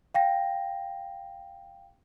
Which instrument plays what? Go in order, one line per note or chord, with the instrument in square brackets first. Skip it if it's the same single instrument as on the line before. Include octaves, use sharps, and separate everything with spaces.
[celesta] F5 G5 A#6